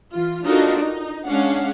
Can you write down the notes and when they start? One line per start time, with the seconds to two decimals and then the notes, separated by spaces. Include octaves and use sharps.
0.12 E3 F4
0.46 D4 D#4 F4 F#4 A4 A#4
0.80 D#4
1.26 G#3 C#4 D4 F5 F#5